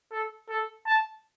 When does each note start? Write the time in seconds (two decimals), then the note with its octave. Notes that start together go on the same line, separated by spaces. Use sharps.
0.12 A4
0.49 A4
0.86 A5